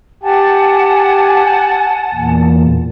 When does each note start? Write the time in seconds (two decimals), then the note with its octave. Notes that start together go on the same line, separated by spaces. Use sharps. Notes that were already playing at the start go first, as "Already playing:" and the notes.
0.23 G4 F#5 G#5 A5
2.15 E2 A#2